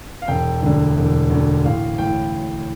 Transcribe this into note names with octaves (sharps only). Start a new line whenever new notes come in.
F5
E1 G5
D2 D3
E1
D2 D3
A1 F5
A2 E3 G5